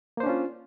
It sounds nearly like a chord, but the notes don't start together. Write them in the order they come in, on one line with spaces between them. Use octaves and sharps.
A#3 C5 D4 C#4 F4